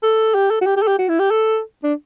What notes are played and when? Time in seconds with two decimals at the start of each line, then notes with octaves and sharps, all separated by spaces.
0.03 A4
0.35 G4
0.50 A4
0.61 F#4
0.66 G4
0.77 G4
0.82 A4
0.87 G4
0.98 F#4
1.09 E4
1.19 G4
1.31 A4
1.84 D4